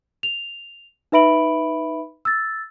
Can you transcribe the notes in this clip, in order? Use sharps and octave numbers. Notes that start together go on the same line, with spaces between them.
F7
D#4 B4 E5 B5 D7 F#7
E6 A6